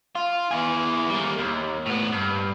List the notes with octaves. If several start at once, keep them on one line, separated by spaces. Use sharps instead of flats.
F4
E4 G#4
G3 A#3
D#2
A2 B3
G2